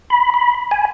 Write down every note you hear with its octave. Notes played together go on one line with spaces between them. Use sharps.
B5
B5
G#5